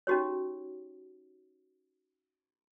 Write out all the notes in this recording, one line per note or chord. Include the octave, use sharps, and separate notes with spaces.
C#4 D#4 F#4 G4 C#5